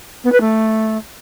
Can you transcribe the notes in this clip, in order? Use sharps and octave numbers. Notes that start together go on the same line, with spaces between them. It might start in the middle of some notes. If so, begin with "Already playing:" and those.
B3
B4
A3